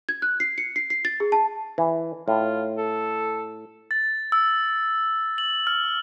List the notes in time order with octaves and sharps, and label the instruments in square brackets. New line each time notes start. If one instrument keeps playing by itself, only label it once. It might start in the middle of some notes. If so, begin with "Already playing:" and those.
[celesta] G#6
F#6
C7
C#7
C7
C7
A6
G#4
A5
[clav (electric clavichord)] E3
[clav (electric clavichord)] A2 [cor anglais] F4
[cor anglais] A4
[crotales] A6
E6
F#7
F6